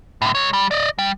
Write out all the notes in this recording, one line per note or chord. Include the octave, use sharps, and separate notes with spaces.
A2 D3
G#3 C#5
G3
D5 D#5
G3